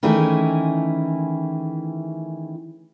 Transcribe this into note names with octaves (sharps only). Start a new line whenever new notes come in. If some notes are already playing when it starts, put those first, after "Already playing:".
D#3 E3 A3 C#4 E4 G#4